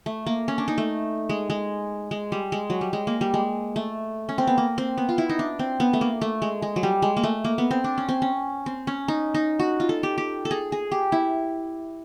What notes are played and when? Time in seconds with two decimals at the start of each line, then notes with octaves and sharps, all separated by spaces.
0.06 A3
0.26 A#3
0.48 C#4
0.58 D4
0.68 D#4
0.78 A3
1.29 G#3
1.50 G#3
2.11 G#3
2.32 G3
2.52 G#3
2.70 F#3
2.81 G3
2.93 G#3
3.07 A#3
3.21 G3
3.34 G#3
3.76 A3
4.29 C#4
4.38 C4
4.47 B3
4.58 A#3
4.78 C4
4.98 B3
5.09 F4
5.18 E4
5.29 D#4
5.39 D4
5.59 C4
5.80 B3
5.93 A3
6.01 A#3
6.21 A3
6.42 G#3
6.62 G#3
6.76 F#3
6.83 G3
7.02 G#3
7.17 A#3
7.23 A3
7.44 A#3
7.58 B3
7.71 C4
7.84 D4
7.98 C#4
8.09 C4
8.22 C#4
8.66 C4
8.87 C#4
9.08 D#4
9.34 D#4
9.59 F#4
9.80 F4
9.89 A4
10.03 G4
10.18 G4
10.45 A4
10.51 G#4
10.72 G#4
10.91 G4
11.12 E4